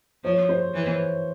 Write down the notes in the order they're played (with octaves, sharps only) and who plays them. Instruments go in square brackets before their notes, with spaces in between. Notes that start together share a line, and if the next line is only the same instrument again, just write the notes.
[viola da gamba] F3 [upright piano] C#5
[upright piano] C5
[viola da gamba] E3